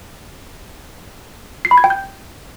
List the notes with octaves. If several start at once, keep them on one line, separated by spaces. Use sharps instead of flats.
C7
B5
G#6
G5
G6